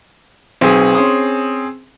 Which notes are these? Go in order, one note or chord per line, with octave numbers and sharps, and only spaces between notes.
B1 C4 G#4
C#4 C6 D#6